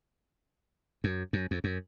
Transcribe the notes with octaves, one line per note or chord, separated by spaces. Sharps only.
F#2
F#2
F2
F#2